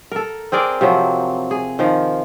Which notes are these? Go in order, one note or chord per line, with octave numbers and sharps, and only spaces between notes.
A4 A#4
C4 G#4 A#4 D5
C3 F3 F#3
G#4
D#3 F3